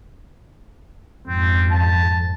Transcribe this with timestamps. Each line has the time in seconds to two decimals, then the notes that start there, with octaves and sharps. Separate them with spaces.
1.27 F2 G#2 C4
1.71 A5